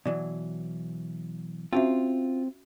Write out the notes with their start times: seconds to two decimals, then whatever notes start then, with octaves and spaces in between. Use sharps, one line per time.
0.06 B2 E3 F#3 D5
1.73 C4 C#4 F4 F#4 E5